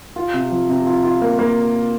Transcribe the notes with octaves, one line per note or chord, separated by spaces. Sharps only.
F4
C3
F3
C3
F4
F4
A#3
A#3